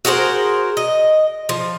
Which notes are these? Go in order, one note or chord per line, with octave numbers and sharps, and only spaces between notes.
F#4 G#4 A#4 C5
D#5
F3